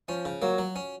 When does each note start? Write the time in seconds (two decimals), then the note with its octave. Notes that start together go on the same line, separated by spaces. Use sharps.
0.09 F3 C#4
0.25 C#3
0.42 F#3 A#3
0.58 F#3
0.76 C#4